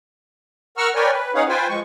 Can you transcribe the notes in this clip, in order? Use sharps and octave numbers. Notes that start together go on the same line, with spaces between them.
A#4 F#5 C#6 E6 F6
A#4 B4 C#5 D5 G5 G#5
B4
C#4 D#4 G#4 C#5 F5 F#5
F4 B4 C5 G5 G#5
F3 G#3 C#6